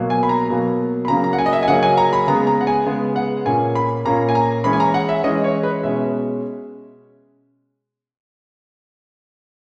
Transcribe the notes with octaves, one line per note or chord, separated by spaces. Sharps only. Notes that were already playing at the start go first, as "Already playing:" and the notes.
Already playing: B2 F#3 A#3
G#5
B5
A#5
B2 F#3 A#3
B5
C#3 F#3 A#3 C#4 A#5
A#5
F#5
G#5
D#5
E5
G#5
C#3 F#3 A#3 C#4 F#5
G#5
A#5
B5
C#3 G#3 B3 A#5
A#5
F#5
G#5
C#3 G#3 B3
F#5
A#2 A#3 C#4 G#5
B5
A#2 A#3 C#4 A#5
G#5
A#5
E3 G#3 C#4 B5
G#5
A#5
F#5
E5
E3 G#3 C#4 D#5
C#5
B4
B2 G#3 C#4 E5